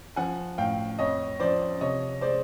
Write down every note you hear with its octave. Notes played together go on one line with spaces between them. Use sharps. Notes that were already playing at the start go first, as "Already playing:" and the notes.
F3 F#5 G#5
A2 F5 G5
F2 C#5 D#5
F3 C5 D5
C3 C#5 D#5
G#3 C5 D5